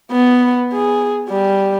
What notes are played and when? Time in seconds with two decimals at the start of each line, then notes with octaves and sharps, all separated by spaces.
0.11 B3
0.73 G#4
1.29 G3